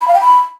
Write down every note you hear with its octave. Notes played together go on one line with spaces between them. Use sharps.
B5
F5
G5
B5